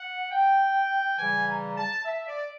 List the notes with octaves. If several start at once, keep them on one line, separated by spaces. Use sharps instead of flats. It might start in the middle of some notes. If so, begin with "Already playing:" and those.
Already playing: F#5
G5
C#3 E3 G3 G#5
A#5
A5
E5
D5